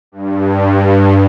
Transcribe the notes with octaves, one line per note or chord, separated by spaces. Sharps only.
G2